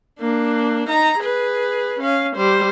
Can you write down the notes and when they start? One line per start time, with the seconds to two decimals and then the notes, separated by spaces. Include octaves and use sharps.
0.20 A#3 D4
0.89 D#4 A#5
1.20 G#4 B4
2.00 C#4 F5
2.36 G3 C5